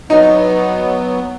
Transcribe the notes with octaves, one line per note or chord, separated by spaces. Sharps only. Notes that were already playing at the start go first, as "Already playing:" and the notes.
F#3 B3 D#4